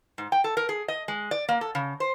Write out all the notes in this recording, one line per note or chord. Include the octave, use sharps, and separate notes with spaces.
G#2
G5
A4
A#4
G#4
D#5
G#3
D5
A#3
A4
C#3
C5